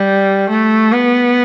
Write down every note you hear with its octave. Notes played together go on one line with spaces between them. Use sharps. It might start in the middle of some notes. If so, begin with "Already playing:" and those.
Already playing: G3
A3
B3